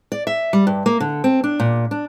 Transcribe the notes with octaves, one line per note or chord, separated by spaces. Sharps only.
D5
E5
G3
G2
A#3
D3
C4
D4
A#2
D4